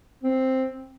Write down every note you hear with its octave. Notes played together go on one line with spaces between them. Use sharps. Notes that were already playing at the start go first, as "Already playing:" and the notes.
C4